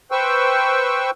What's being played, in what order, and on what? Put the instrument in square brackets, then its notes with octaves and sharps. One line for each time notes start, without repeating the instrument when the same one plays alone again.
[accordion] B4 C5 G5 C#6 E6